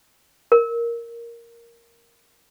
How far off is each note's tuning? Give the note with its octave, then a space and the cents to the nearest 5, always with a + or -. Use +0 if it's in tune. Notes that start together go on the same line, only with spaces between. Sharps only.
A#4 +0